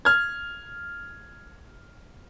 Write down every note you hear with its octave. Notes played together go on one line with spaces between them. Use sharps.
F6 G#6